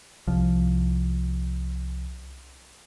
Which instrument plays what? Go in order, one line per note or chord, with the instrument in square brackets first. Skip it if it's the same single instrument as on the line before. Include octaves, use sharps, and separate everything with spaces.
[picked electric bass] C2 F3